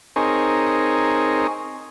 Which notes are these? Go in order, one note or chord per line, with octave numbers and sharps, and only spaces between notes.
C4 D#4 G#4 A#4 C#5